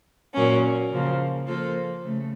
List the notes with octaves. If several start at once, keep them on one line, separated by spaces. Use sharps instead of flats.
A#2 F#3 A#3 C#4
C#3 F3 A#3
F3 A#3 F4 A4 C5
C#3 A3